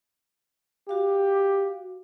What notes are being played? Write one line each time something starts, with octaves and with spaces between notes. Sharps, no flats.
F#4 G4 F5